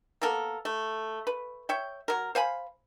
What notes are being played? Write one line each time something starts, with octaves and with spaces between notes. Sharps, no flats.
A#3 B3 A4 A#4
A3
B4
C#5 E5 G5
F#3 A#4
C5 F5 G#5 B5